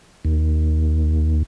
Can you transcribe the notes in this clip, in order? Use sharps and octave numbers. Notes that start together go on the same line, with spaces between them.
D#2